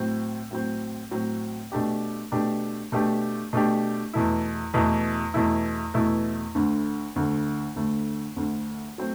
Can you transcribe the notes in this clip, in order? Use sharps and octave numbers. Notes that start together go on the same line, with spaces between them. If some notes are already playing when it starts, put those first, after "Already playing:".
Already playing: A2 F#3 C4
A2 F#3 C4
A2 F#3 C4
B2 A3 D4 G4
B2 A3 D4 G4
B2 A3 D4 G4
B2 A3 D4 G4
E2 B2 A3 E4
E2 B2 A3 E4
E2 B2 A3 E4
E2 B2 A3 E4
D2 D3 A3
D2 D3 A3
D2 D3 A3
D2 D3 A3
F#3 A3 C4